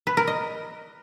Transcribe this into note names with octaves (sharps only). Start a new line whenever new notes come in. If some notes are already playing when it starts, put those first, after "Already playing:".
B4
A#4
D#5